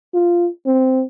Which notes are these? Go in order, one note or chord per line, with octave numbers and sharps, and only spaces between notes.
F4
C4